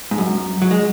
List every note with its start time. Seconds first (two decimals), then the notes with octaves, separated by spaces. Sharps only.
0.11 G#2
0.18 F#2
0.62 F#3
0.71 G#3